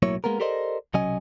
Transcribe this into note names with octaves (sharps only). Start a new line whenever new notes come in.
B1 A2 F#3 A#3 E4 C#5
G#3 A#3 B3 A#4
G4 A4 A#4 C5 D5 D#5
B1 C3 F#3 C#4 D#5 G#5